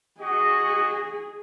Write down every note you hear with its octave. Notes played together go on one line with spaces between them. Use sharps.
F#4 G#4 D#5 C#6